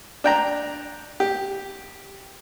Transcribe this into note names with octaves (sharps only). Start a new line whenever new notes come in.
D4 G5 A#5
G4